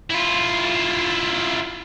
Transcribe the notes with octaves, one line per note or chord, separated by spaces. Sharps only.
E4 F4